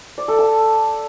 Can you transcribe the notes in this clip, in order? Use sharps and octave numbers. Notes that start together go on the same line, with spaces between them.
D5
A4
A5